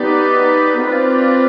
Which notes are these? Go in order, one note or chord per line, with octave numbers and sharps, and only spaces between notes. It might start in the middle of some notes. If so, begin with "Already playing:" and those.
Already playing: B3 D#4 G4 B4 D5
C4 F4 B4 D5